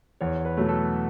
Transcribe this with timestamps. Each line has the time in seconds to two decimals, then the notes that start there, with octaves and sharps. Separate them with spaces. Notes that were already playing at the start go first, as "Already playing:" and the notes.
0.21 E2 C#5
0.45 B4
0.57 B2 F#3 A3
0.69 A4